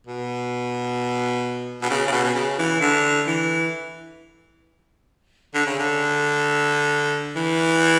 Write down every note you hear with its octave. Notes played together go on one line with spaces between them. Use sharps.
B2
B2
C#3
C#3
B2
B2
C#3
E3
D3
E3
D3
C#3
D3
E3